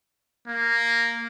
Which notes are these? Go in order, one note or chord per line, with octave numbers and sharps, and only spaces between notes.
A#3